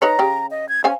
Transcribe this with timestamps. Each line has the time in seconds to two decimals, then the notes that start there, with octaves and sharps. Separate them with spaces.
0.02 D#4 B4 C#5 A#5
0.19 C#3 G4
0.51 D#5
0.69 G#6
0.84 C#4 C5 F5 G#5